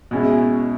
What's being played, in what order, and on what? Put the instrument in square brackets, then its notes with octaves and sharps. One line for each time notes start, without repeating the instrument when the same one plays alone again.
[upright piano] B2 G#3 C#4 E4